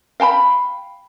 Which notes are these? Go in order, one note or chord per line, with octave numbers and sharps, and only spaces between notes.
F5 G5 A5 B5